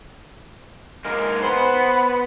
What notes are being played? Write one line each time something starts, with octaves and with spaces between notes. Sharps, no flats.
G#3 A#3 D#4 A#4
B3 B4 C5